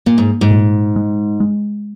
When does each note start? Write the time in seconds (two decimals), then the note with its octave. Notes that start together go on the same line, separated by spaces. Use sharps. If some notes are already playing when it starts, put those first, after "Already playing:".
0.06 A#2 A#3
0.18 G#2
0.41 G#2
0.51 A#2
0.96 G#3
1.40 G#3